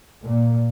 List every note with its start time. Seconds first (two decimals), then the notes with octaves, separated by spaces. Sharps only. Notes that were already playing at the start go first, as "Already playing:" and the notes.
0.22 A#2